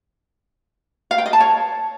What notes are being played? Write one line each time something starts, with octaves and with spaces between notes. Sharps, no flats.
F5
G5
D#5
A5
C#5